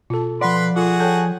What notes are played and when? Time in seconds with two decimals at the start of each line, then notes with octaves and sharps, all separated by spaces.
0.10 B2 F4 A4 A5
0.41 F3 B4 D5 F#5 B5 C6
0.76 F4 F#4 G#4 A4 F#5
1.00 A4 C#5 G5 A5 G6